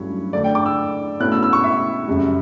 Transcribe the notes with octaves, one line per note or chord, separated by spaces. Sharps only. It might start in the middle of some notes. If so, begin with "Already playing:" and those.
Already playing: G2 F#3 A3 C#4 E4 C#5
D3 A3 D4 D5
G5
D6
E6
B2 A3 C#4 E4 F#6
E6
E6
C#6
E5
F#2 C#3 G3